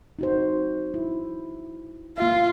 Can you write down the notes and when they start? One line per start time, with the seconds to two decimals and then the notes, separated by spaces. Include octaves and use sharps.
0.19 D#4 F#4 C5
0.94 E4
2.18 A#3 F4 E5